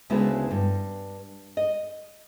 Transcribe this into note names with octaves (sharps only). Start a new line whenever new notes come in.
D2 C#3 G#3 B3 E4 F#4
G2
D#5